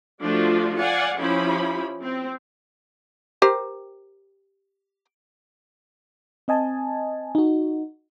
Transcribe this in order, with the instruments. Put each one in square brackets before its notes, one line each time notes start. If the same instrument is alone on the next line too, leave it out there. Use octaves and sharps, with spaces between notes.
[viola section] F3 A3 D4 F4 F#4
D5 F5 F#5 G#5
F3 C#4 E4 G4 B5
C4
[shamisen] G4 A#4 C5
[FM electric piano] C4 D#5 G#5 A5
D#4 F#4